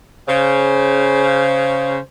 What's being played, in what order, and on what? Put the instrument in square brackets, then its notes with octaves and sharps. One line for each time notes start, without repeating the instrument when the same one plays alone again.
[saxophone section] C#3 C5